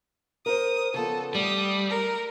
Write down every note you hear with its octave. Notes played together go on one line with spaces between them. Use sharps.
A#4 C5 D#6
C#3 F3 B3 A4
G3 A3 D#6
A#4